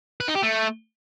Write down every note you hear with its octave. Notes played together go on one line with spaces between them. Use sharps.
B4
D#4
G4
A3